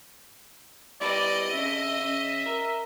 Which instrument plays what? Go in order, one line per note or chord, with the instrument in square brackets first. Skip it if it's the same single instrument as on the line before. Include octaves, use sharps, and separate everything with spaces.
[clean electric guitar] G3 B3 E4 [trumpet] D5 [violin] D#5
[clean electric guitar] C#3 D4 [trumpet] E5
[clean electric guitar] C#3
A#4